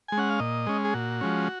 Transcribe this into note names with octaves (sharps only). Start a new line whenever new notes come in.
G#3 G#5
C#4 F#5
F5
A#2 D#5
G#3 C#4
G#4
A#2 F#4
F3 G#3 C#4